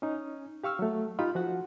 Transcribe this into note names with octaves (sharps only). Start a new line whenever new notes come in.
C#4 D#4
G4 F5 C#6 E6 F6
F#3 A3
D#4 F4 G4 B5
F3 F#4 F#5